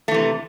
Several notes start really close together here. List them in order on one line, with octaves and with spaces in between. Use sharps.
A3 E3 C3